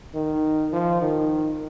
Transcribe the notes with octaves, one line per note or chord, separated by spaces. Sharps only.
D#3
F3
D#3